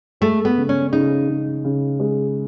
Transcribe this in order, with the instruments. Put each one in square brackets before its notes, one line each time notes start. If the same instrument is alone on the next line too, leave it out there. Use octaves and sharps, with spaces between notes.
[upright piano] G#3 [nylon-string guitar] A3
[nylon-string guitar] B3
[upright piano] C#3
[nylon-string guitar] C#4
[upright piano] C#3 [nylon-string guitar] D#4
[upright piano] C#3
C#3
G#3